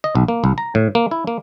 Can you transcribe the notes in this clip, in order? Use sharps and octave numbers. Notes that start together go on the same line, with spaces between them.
D#5
B1
A#3
C2
A#5
A2
A#3
E4
A#3